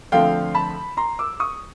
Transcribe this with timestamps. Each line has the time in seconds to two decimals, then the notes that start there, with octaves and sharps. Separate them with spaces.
0.12 D3 F3 A3 C4 F5 G5
0.55 A5 B5
0.97 A#5 C6
1.19 D6 E6
1.40 C#6 D#6